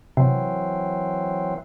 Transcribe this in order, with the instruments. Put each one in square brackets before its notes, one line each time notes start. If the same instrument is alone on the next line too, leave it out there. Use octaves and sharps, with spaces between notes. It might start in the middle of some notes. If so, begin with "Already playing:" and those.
[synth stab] C3 [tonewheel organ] E3 F#3 C4